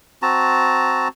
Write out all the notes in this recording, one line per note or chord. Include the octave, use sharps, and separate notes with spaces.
C4 F#4 A5 A#5